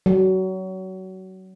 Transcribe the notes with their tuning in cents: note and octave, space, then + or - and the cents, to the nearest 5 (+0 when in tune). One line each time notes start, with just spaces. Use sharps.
F#3 +25